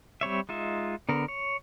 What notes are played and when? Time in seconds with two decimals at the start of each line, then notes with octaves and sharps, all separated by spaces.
0.21 G3 C4 C#5 E5
0.49 G#3 D#4 F4 E5
1.09 D3 B3 A#4
1.28 C#5